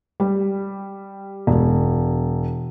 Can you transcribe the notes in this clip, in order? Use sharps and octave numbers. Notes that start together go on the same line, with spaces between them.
G3
E1